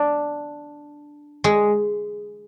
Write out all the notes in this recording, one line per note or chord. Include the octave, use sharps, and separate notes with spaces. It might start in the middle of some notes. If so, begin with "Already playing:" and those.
Already playing: D4
G#3